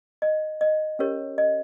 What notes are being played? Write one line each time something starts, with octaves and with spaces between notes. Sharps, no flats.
D#5
D#5
C#4 G4 A#4 C#5
D#5